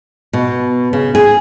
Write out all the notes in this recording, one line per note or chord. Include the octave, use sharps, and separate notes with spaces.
B2
C#3
G#4